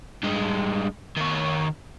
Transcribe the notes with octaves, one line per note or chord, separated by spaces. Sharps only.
G2 G#3
D#3 C#5